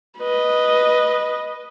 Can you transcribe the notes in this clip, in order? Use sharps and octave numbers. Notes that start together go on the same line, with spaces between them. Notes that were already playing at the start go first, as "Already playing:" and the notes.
B4 D#5